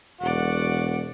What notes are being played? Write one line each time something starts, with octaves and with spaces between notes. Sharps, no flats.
E1 F#4 D5 F#5